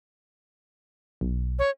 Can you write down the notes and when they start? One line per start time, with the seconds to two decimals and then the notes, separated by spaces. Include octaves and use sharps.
1.21 B1
1.59 C#5